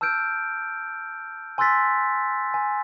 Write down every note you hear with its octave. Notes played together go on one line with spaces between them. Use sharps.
A5 E6 F6 G6 D7
G#5 C6 E6 F#6 A6 B6
G#5